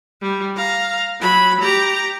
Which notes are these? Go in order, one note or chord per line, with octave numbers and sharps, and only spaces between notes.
G3
F5 A#5
F#3 B5
G4 A#5